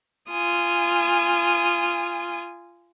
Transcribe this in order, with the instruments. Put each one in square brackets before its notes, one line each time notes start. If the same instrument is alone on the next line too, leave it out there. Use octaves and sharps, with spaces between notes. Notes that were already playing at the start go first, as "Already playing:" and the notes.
[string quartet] F4 G#5 D#6